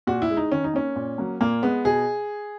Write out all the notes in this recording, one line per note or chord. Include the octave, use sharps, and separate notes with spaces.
A#2 F#4
E4
G#3
D#4
D#3 C#4
D#4
A#3 C#4
A#2
F#3 A#3
A#2 A#3
G#3 B3
B2 G#4